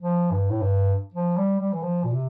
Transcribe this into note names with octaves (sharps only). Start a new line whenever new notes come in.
F3
G2
A2
G2
F3
G3
G3
E3
F3
A#2
C3